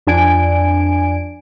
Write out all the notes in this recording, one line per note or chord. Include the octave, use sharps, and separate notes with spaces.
F2 D4 G#5 D7